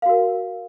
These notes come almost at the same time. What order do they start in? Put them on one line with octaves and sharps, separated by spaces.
F5 F#4 A#4